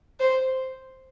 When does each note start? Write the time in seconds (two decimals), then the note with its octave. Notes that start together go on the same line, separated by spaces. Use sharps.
0.20 C5